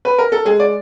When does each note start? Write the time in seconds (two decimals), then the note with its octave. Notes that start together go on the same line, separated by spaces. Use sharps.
0.05 B4
0.18 A#4
0.32 A4
0.45 G#3 G#4
0.60 D5